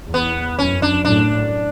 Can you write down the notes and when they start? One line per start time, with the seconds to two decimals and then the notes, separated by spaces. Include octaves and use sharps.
0.14 E2 B3
0.59 F#2 C#4
0.82 D4
1.04 F#2 A2 D4